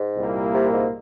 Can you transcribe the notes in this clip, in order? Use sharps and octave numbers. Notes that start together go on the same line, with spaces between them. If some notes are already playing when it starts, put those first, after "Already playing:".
Already playing: G#2
C2 A#2 G3 A#3 E4
C3
G#2